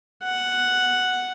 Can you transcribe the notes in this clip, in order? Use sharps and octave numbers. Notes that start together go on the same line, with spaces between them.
F#5